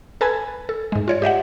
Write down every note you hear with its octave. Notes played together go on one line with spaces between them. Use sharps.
A4 B4 G#5 A5 B5 G#6
A4
G#2 G#3
F4 C#5 D5
G4 D#5 E5 F#5